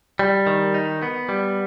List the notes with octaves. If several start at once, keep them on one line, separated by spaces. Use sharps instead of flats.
G3
D#3
D#4
B3
G3